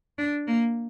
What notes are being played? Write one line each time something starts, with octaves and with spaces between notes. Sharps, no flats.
D4
A#3